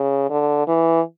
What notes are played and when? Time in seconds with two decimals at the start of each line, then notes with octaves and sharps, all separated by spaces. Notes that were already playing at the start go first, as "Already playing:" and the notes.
Already playing: C#3
0.30 D3
0.68 E3